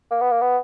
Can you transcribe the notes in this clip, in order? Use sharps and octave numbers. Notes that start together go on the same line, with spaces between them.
A#3
B3
A#3
B3